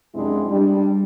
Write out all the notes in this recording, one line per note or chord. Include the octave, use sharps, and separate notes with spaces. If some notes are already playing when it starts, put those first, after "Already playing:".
F#2 C3 G#3 C4 D4 E4
G3 D4